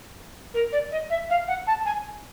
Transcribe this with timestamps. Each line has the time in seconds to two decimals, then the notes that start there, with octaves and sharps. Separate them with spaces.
0.54 A#4
0.72 D5
0.91 D#5
1.09 E5
1.29 F5
1.48 F#5
1.67 A5
1.85 G#5